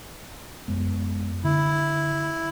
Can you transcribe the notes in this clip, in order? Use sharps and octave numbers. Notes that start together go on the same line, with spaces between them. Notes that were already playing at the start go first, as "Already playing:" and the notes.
F#2 G#3 B3
D3 E4